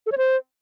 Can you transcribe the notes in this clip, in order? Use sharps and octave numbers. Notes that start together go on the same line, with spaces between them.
A4
C#5
C5